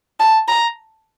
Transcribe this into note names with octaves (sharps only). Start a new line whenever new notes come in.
A5
A#5